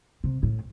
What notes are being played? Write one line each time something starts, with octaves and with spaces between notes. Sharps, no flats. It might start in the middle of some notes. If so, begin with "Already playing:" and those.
C3
A2